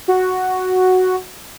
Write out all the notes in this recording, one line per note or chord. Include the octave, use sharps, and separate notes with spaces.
F#4